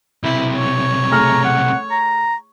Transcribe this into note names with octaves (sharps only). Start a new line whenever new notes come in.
B1 C3 E4
C#5
A3 G#4 A#5 F6
F#5
A#5